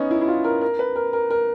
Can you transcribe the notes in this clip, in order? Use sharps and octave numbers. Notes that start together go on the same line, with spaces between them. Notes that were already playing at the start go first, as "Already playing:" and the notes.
Already playing: B3 C#4 D#4
E4
E4
F4
A#4
A#4
B4
A#4
A#4
A#4